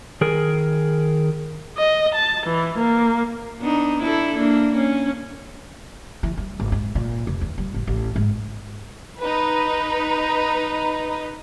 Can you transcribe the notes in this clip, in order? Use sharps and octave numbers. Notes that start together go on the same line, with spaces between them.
D#3 G#4 A#4
D#5
A5
E3
A#3
B3 D4 D#4
D4 E4 A4
A#3 D4
C#4
E3
G3
G#1
G#2
A#2
F1
E2
G3
A1
A1
G#2
D#4 B4